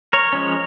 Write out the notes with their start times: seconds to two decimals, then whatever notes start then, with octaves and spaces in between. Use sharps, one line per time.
0.13 A#4 C#5
0.33 F3 G#3 C#4